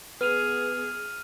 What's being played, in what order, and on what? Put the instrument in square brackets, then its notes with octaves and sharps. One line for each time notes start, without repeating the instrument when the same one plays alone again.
[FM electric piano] B3 [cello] G#4 [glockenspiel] F6 D#7 F7